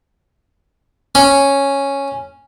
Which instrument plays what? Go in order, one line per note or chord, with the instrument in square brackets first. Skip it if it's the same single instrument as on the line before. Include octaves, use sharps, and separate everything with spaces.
[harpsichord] C#4